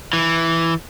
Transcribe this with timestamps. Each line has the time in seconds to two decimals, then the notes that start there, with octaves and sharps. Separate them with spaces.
0.13 E3